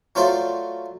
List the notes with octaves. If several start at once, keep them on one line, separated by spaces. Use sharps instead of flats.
F#3 A3 F4 A#4 C5 D5